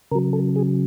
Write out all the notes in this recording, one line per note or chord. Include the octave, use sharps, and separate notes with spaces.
C#3 F#3 A#4
A4
G#4